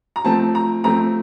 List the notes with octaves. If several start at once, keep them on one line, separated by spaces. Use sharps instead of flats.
A#5
F3 A3 C4 A5
A#5
F3 A3 C4 A#5